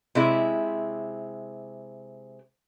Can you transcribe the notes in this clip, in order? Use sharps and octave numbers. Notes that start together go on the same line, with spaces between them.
C3 G#3 E4